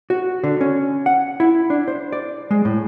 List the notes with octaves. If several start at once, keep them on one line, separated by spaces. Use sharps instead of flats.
F#4
D3
C#4
F#5
E4
D4
C5
D5
G#3
A2